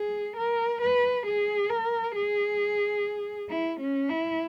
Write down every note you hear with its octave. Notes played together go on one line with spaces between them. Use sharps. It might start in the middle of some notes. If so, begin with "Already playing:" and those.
Already playing: G#4
A#4
B4
G#4
A#4
G#4
E4
C#4
E4